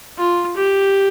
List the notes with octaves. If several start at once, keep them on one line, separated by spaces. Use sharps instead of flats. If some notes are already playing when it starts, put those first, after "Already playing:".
F4
G4